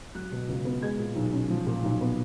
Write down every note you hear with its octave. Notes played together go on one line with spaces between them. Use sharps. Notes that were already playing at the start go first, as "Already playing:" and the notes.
F#3 F#6
B2
C#2
B3
G#3 G#6
A#2
B1
C#4
F3
A#2
B1
B3